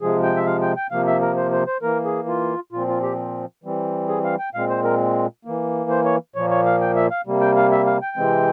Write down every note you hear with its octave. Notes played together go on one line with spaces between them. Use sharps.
C3 F3 G#3 G#4
G5
E5
F5
G5
G5
C3 F3 A#3 F5
E5
A#4
C5
C5
C5
E3 A#3 A#4
G#4
F4
A#2 F3 C4 F4
F4
G4
E3 G3 C4
G#4
F5
G5
A#2 G#3 C4 F5
C5
A#4
E3 A#3
C5
C#5
A#2 F3 A#3 C#5
C#5
F5
G5
E5
F5
C3 G3 A#3
G5
F5
E5
F5
G5
C3 E3 G#3 C4